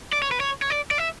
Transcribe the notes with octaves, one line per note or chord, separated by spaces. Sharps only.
D5
C#5
B4
C#5
C#5
D5
D5
E5